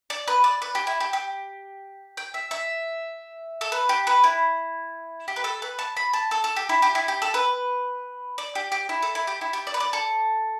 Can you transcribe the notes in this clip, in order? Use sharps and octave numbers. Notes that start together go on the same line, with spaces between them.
D5
B4
D5
B4
G4
E4
G4
G4
G5
E5
E5
A4
B4
G4
B4
E4
G4
B4
A4
B4
A5
B5
A5
A4
A4
G4
E4
G4
E4
G4
A4
B4
D5
G4
G4
E4
A4
E4
G4
E4
G4
D5
B4
D5
A4